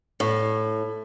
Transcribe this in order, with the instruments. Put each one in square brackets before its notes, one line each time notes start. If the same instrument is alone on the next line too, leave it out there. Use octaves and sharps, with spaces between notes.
[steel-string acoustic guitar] A2